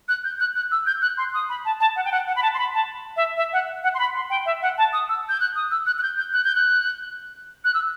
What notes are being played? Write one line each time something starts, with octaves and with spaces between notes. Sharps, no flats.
F#6
G6
F#6
F#6
E6
G6
F#6
C6
D#6
B5
A5
A5
F#5
G5
F#5
F#5
B5
A5
C6
B5
A5
E5
E5
F#5
F#5
C6
B5
C6
G5
E5
F#5
A5
D#6
E6
G6
F#6
D#6
E6
F#6
F#6
G6
G6
F#6
G6
F#6
F#6
E6